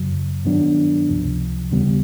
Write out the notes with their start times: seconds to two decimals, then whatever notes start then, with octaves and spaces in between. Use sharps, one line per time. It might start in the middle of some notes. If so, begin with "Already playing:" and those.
Already playing: F#2 C#3 F#3
0.45 G2 D#3 F#3 B3 D4
1.09 C#2 C3 F3
1.72 D#2 C#3 E3 G3 B3